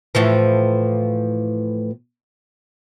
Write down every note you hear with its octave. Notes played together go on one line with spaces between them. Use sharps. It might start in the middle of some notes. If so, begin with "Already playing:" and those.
A2 E3 F3